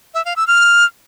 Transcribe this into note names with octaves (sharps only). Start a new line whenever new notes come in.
E5
F5
E6
F6